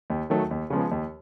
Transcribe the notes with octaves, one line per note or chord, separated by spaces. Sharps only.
D#2
D#3 F#3 A3
D#2
C#3 F3 G#3 B3
D#2